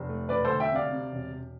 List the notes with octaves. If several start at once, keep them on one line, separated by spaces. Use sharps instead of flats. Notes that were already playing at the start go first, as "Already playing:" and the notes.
Already playing: F1
A3
E1 B4 D5
A4 C5
D2
E5 G5
C3 D5 F5
C3
E1
E1